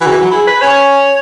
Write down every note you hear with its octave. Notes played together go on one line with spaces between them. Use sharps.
E3 F#4
C#3
E3
F#3
E4 G#4
B4
C#4 C#5